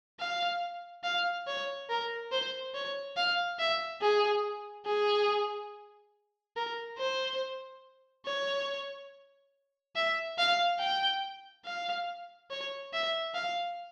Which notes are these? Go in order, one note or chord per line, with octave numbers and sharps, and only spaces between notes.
F5
F5
C#5
A#4
C5
C#5
F5
E5
G#4
G#4
A#4
C5
C#5
E5
F5
G5
F5
C#5
E5
F5